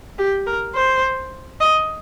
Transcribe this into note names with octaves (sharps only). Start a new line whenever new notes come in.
G4
A#4
C5
D#5